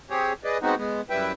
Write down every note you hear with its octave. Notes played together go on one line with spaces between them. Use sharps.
C4 G4 G#4 C#5
G#4 B4 D5 D#5
G#3 B3 C4 D#4 F#4
G#3 B3
F#2 G3 E4 B4 E5 G5